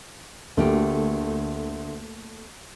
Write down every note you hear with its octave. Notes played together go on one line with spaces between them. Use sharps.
D2 A3 A#3 G4